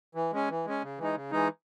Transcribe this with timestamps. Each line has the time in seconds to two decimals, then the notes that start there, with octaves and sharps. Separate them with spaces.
0.15 E3
0.32 G#3 C#4
0.49 E3
0.66 G#3 C#4
0.82 C#3
0.98 E3 G#3 D#4
1.15 C#3
1.31 E3 G#3 D#4